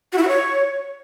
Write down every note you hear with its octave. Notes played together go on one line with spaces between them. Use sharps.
F#4
E4
F#4
C#5